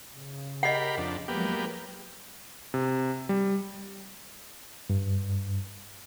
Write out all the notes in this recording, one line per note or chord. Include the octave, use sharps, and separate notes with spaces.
C#3
G4 A#4 D#5 F#5 B5
F2 D4
F3 F#3 G#3 A#3 B3 G4
C3
G3
G2